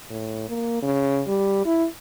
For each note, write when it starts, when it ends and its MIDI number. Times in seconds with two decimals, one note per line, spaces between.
0.10 0.48 45
0.49 0.82 58
0.83 1.22 49
1.27 1.65 55
1.66 1.86 64